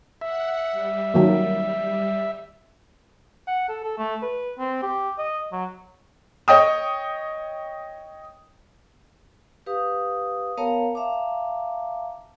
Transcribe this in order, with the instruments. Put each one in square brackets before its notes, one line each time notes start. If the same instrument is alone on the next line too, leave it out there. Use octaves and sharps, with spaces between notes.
[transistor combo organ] E5 [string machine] F#5
[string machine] G3
[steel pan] D#3 F#3 A#3
[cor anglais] F#5
A4
A4
A3
B4
C4
G4
D#5
F#3
[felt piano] C#5 D#5 G5 D#6
[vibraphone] G4 B4 F5 D#6
B3 A#4 C#5 F5 A5 A#5
E5 F5 A5 A#5 D6